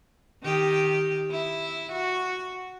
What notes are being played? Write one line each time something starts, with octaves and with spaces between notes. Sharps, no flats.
D#3 G4
E4
F#4